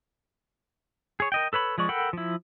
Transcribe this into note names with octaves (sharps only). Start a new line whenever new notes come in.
G#4 C#5
A#4 D#5 G5
A4 B4 C#5 B5
F3 G#3 D5 C#6
A4 A#4 F#5 G5 B5
F3 E4